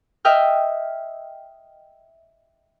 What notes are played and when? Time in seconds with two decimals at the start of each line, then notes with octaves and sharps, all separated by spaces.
0.25 D#5 E5 G5 F6